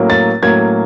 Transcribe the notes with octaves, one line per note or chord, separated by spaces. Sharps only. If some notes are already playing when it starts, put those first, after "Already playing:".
Already playing: A2 F#3 A#3 C#4
A6
A2 F#3 A#3 C#4 G#6